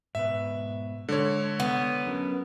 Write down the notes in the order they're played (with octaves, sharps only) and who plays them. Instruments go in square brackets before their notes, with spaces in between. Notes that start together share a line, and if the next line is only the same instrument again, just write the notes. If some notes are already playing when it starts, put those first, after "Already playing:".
[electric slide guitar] G#2 B2 B4 [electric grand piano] E5
[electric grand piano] D3 C#5 [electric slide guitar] G#3
[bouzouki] B3
[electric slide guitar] F#3 C#4 A#4